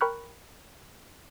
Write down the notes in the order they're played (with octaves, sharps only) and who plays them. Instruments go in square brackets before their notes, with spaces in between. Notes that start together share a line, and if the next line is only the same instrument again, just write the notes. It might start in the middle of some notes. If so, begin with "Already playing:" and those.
[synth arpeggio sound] A#4 G5 B5 C#6 F6 F#6